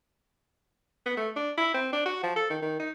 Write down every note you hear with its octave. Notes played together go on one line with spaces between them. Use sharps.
B3
A3
D4
E4
C4
D4
F#4
F3
A4
D#3
D#3
D#4